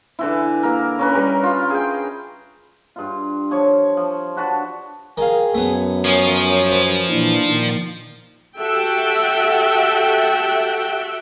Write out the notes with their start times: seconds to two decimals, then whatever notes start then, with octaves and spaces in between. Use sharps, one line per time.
0.19 D3 E3 E4
0.63 A#3 A#4
0.99 C#4 A#4 B4
1.15 G3 A#4 B4
1.43 F4
1.70 G#4 G5
2.96 G2 F4
3.51 F3 C#5
3.97 F3
4.36 D4 F#4 B4 A5
5.18 D#3 G#4 F5
5.54 F#2 A3 B3
6.05 F3 C#5 G#5 D#6
6.71 B4 C5
7.09 A#2 E3 D4
7.46 A#2 D#3
8.60 F#4 G4 A4 E5 F#5 G5